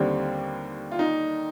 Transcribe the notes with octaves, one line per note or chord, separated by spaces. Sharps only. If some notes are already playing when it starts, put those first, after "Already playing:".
Already playing: D#2 D3 G3 C4
F4
D#4